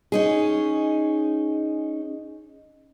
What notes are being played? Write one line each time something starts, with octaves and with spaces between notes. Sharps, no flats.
C#4 D#4 G#4